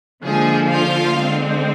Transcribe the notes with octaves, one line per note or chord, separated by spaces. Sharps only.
D3 F3 G#3 A#3 G#4
F4 F5
D3 G#3 C4